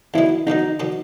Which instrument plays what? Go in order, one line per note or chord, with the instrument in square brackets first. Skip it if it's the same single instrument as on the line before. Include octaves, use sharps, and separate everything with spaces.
[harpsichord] E2 C3 D#3 F#3 [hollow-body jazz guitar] E4
[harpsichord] E2 C3 D#3 F#3 [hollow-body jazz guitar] D#4
[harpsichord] C3 D#3 F#3